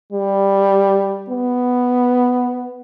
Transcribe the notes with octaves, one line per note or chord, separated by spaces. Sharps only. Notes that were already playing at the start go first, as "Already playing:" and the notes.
G3
B3